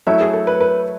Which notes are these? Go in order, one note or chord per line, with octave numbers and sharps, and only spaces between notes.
F#3 A3 E4 E5
G#4
A4
B4
B4